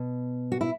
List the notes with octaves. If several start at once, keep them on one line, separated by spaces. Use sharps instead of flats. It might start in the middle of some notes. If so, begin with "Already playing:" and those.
Already playing: B2
F#4
E4